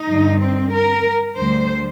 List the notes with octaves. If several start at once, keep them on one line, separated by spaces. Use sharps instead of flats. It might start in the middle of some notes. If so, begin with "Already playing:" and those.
Already playing: D#4
G2 D3 G3
C4
A#4
D2 D3 G3 C5